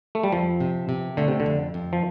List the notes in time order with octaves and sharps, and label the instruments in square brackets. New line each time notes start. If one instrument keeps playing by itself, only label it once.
[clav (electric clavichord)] A3
G3
[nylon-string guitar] F2 [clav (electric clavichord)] F3
[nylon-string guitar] C3
C3
[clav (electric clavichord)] D3 [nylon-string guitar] A3
[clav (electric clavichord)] C3
D3
[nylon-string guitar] F2
F2
[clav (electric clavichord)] F3